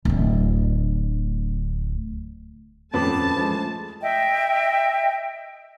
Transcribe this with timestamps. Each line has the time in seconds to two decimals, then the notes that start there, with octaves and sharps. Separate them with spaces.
0.05 D1 D2
2.94 D#1 F2 A3 C#4 B4 A5 B5 D6
3.36 F3 G#3
4.02 D#5 E5 G5